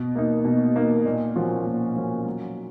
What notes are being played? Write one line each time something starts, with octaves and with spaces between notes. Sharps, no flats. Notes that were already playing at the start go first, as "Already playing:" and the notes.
Already playing: B2
A#3 D#4
B2
A#3 D#4
A#2
F3 A#3 C#4 F#4
A#2
F3 A#3 C#4 F#4
F#3